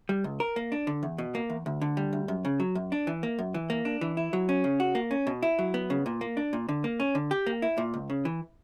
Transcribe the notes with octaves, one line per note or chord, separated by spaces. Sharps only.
G3
C#2
A#4
A#3
D4
D3
E2
B2
A#3
E2
D2
D3
G3
D2
F#2
C#3
F#3
F#2
D4
E3
A#3
F#2
E3
A#3
D4
E3
E4
F#3
C#4
C#3
F#4
A#3
C#4
B2
E4
F#3
B3
C#3
A#2
A#3
D4
A#2
D3
A#3
C#4
D3
G4
A#3
E4
A#2
C#2
C#3
E3